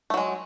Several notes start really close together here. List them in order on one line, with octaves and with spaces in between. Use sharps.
A3 F#3 G#3